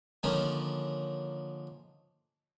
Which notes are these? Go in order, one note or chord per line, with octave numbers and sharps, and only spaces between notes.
D3 D#3 F3 A#3 C#4